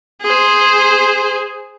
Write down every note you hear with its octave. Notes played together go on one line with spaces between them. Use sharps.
G#4 C5